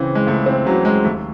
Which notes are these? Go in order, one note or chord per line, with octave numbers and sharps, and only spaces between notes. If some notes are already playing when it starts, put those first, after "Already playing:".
Already playing: C#2 C#3 E3 C4
G#3
C#2 A3
C4
C#3 E3 F#3
G#3
D#2 A3